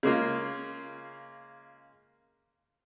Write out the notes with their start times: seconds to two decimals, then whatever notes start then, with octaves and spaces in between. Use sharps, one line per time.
0.03 C#3 G#3 A#3 F4